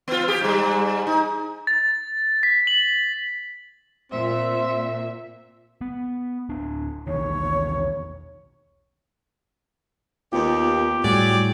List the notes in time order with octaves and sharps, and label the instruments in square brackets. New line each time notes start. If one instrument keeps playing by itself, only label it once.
[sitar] B3 F4
G4 G#4
G#2 G3
D#4
[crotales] A6
B6
F#7
[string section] A#2 [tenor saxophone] C4 [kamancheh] E5
[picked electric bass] B3
D1 D4
[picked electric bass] B1 E2 D#3 [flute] C#5
[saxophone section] D#2 [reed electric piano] B3 F4 [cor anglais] G4
[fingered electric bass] A2 [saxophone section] F#3 G#4 D5 [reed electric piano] G3